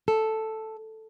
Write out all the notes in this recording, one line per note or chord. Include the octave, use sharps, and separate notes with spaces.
A4